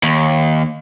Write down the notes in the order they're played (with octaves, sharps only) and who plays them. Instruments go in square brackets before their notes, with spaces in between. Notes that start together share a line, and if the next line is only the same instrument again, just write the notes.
[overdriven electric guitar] D#2